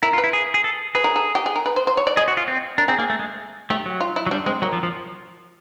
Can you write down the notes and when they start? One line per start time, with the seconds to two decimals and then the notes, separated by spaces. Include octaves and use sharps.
0.02 E4 A#4
0.13 F4
0.18 B4
0.24 E4
0.33 G#4
0.54 G#4
0.64 A4
0.95 G#4 B4
1.04 A#4
1.16 A4
1.35 G4
1.46 G#4
1.56 A#4
1.66 B4
1.76 C5
1.87 C5
1.97 C#5
2.07 D5
2.17 G#4 D#5
2.28 F#4
2.37 F4
2.48 C4
2.78 D4 A#4
2.88 C4 G#4
2.99 A#3 G#4
3.10 A3
3.19 G#3
3.70 A3 G4
3.86 F#3
4.01 F4
4.16 E4
4.26 F#3
4.31 G3 D4
4.46 G#3 C4
4.62 F#3 A#3
4.73 F3
4.83 F3